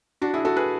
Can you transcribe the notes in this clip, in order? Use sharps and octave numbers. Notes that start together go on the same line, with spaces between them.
D4 F#4
E4 G#4
F#4 A4
G#4 B4